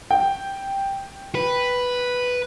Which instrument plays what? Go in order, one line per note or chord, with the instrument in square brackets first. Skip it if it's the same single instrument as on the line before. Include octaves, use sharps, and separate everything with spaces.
[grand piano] G5
[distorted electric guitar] B4